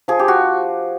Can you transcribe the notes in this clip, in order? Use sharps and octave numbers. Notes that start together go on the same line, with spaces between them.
F3 G#4
G4
F#4